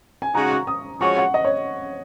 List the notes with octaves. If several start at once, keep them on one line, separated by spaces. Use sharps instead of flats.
G#5
C#3 G#3 D#4 F#4 A#5
C#6
D#6
F3 G#3 C#4 F#4 C#5 C#6
F#5
D#5
C#5